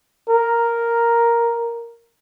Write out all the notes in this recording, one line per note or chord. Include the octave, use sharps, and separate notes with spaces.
A#4